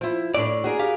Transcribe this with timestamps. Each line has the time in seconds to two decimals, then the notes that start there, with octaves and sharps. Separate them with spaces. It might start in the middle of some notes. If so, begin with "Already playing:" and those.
0.01 F3 E4
0.35 A2 D4 D5
0.64 F#4 G#4 A#4
0.80 G4 F5